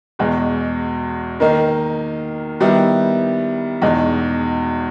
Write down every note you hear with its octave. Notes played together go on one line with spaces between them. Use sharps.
E2 B2 G#3
D#3 A#3 D#4
D#3 G3 B3 E4
E2 B2 G#3 D#4